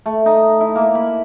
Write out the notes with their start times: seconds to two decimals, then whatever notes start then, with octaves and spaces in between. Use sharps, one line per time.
0.06 A3
0.26 D#4
0.61 E4
0.75 A#3
0.95 B5